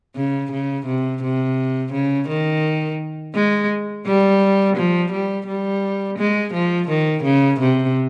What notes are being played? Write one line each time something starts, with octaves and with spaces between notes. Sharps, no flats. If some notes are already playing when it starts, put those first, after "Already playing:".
C#3
C#3
C3
C3
C#3
D#3
G#3
G3
F3
G3
G3
G#3
F3
D#3
C#3
C3